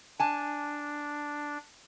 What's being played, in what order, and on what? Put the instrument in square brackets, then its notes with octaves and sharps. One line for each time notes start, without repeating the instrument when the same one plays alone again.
[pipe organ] D4 [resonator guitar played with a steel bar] G#5 A5